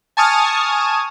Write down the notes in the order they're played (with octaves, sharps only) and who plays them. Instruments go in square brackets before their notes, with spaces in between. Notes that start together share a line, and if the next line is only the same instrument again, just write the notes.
[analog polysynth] G#5 A5 C#6 D#6 F6 G#6